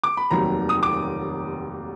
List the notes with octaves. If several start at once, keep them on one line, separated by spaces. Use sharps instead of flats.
D6
B5
F1 D#2 D#3 F#3 A#5
D#6
D6